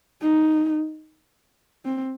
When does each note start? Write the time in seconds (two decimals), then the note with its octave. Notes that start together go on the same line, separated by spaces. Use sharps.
0.22 D#4
1.85 C4